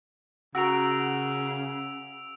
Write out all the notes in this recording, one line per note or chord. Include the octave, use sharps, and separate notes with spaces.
C#3 F#4 A#4 E6 D7 F7